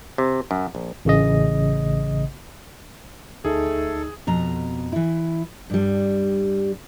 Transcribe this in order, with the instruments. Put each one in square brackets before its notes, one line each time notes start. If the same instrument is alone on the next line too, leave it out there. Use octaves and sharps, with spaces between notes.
[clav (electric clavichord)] C3
F#2
A#1
[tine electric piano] A1 C#3 D#5
[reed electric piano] D2 D#4 [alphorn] A3 [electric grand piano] G#4 [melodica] A4
[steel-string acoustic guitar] F2 B2 A#5
E3 E4
G2 G3